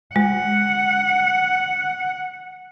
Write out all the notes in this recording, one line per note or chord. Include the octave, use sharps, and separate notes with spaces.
G#3 F#5